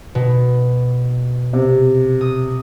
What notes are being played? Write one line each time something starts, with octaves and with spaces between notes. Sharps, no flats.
B2
C3
D#6